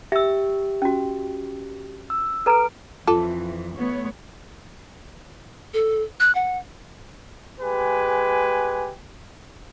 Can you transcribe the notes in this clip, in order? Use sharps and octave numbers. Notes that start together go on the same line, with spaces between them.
G4 E5 E6
C#4 F#4
E6
A4 B4 A#5 F6 D7
F2 E3 F4 A4
A3 B3 C#5
A4
F#6
F#5
G#3 G4 B4 G#5